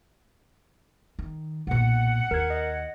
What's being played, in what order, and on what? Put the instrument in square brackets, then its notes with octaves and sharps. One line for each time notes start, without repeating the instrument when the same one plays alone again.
[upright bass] D#3
[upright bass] B1 A#2 [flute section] F#5
[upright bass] D#2 [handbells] A#4 G#6
[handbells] D#5